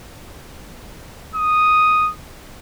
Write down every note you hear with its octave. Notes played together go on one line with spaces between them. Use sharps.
D#6